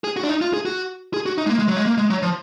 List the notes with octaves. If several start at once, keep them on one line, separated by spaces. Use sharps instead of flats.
G#4
F#4
D4
D#4
F4
G#4
F#4
G#4
F#4
D#4
G#3
A#3
G#3
F#3
G#3
A#3
G#3
F#3
F3